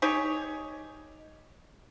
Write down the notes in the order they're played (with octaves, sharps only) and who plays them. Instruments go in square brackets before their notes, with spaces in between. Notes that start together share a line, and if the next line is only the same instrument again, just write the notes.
[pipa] D#4 G4 G#4 C#5